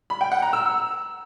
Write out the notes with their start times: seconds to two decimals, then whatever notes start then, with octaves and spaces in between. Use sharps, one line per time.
0.10 B5
0.21 G5
0.32 F#5
0.42 A#5
0.53 E6